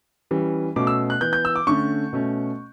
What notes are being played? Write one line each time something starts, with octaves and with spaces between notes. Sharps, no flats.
E3 G3 C#4
B2 A3 C#4 D6
E6
F#6
E3 B3 G6
G6
E6
D6
D3 A3 C#4 C#6
B2 A3 C#4